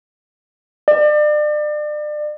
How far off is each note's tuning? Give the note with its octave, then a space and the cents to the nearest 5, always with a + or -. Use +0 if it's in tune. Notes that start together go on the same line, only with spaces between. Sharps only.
D5 +35